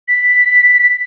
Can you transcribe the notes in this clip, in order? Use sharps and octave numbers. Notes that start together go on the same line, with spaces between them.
B6